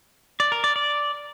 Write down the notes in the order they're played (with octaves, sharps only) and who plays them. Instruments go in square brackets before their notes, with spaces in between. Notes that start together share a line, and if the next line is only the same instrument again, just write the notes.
[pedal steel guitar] D5
A#4
D5
D5